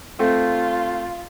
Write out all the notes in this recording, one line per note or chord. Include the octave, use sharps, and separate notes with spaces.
A3 C4 F4